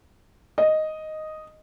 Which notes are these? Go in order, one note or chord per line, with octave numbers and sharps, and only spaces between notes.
D#5